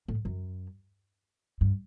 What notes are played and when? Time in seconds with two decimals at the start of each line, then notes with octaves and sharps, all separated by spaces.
0.08 A2
0.25 F#2
1.61 G2